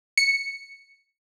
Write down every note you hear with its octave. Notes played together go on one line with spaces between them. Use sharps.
C#7